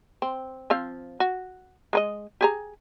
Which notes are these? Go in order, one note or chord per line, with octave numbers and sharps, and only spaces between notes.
C4
F3 C4 F5
F#4
G#3 B4 D#5
G4 G#4 A#5